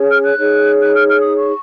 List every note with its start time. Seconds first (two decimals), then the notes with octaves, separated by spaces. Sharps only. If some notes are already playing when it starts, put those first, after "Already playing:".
Already playing: C#4 G#4 C#5
0.08 F6
0.22 F#6
0.37 D#4 G#4 C#5
0.81 F#6
0.94 F6
1.09 F6
1.22 D#6
1.37 C#6